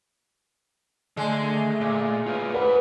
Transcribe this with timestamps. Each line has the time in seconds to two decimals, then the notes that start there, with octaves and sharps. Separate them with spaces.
1.17 D3 G#3 A3
1.81 A#2
2.27 F4 B4
2.54 B4 C5 F#5